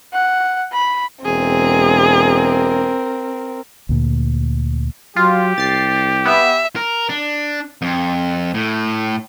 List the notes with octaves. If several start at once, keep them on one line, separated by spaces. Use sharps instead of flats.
F#5
B5
E1 C4 G#4 A#4
D2 A#2
F#3 F4 G4
C2 A6 C7
B3 E5
A#4
D4
F2
A2